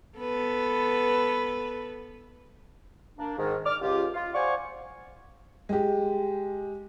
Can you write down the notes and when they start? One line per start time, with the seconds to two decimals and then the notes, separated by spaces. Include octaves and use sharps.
0.18 B3 A4 B4
3.17 A#3 D4
3.38 G#2 D#3
3.65 D6 F6
3.80 C#2 F4 G4
4.14 F4
4.34 C5 D5 F5 F#5 G#5 C#6
5.69 G#3 G4